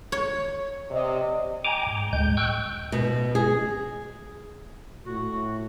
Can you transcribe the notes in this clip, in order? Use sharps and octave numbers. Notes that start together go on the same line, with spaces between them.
C#5
C3 D5 D#5
G5 G#5 A#5 D6
G#2 G5
D2 A2 G#3 G6
G5 C#6 E6 F#6 G6
B2
G#4
A2 F#4